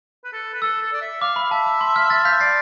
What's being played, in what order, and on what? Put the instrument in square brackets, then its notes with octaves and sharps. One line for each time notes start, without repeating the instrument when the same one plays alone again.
[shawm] B4
A4
B4
[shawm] A4 [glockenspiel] E6
[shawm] A4
D5
E5
[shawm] F5 [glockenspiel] D6
[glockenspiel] B5
[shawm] F5
[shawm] E5 [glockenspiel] A5
[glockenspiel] B5
C6
F6
F6 A6
[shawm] F5 [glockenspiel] G6 B6
[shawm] E5
[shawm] D5 [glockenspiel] A6 C7